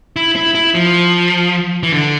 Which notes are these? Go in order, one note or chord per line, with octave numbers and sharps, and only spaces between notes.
E4
E4
E4
F3
E3
D3